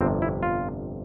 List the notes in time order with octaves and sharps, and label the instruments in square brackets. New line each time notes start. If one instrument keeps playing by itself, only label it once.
[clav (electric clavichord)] G1 F2 C3 C4
E4
F4